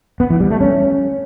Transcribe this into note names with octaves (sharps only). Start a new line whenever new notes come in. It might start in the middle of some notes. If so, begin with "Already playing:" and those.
B3
E3
G3
A3
C#4